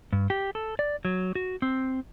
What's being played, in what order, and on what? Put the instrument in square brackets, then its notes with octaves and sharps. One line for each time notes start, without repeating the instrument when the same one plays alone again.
[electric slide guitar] G2
G4
A4
D5
F#3
F#4
C4